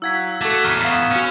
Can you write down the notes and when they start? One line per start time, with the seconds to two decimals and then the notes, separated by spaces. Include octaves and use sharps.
0.02 F#3 E4 F5 F#5 E6 G#6 B6
0.41 A3 F#4 A4 D6 E7
0.64 E2 A2 A#5 F6 G#6 D#7 G7
0.85 B3 F5 C#6 B6
1.11 C#4 F#4 F6